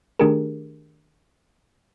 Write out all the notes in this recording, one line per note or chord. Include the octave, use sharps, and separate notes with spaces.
D#3 A3 D4 G4 G#4 A#4